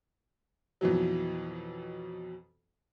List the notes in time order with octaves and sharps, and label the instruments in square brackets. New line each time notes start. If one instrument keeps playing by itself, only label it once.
[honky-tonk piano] F2 B2 E3 F#3